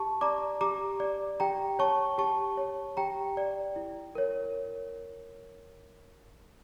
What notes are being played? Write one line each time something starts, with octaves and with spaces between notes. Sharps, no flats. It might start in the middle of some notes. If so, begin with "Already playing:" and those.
Already playing: G4 A5 C#6
D5 A#5 D6
G4 A#5 D6
D5
G4 G5 A#5
C#5 A5 C#6
G4 A5 C#6
C#5
G4 G5 A#5
D5
E4
A#4 C#5